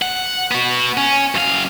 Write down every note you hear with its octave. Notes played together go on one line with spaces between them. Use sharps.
F#5
B3 F#4
C#4
F#2 F5